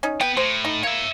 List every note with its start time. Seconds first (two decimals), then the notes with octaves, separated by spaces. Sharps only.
0.03 C#4 D#4
0.21 B3 B4 G5
0.37 A2 C5
0.65 D#4
0.83 A#3 C#5 E5